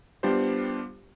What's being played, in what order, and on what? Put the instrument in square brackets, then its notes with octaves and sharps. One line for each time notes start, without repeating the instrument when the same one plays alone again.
[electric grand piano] G3 B3 D4 F4 G4 C5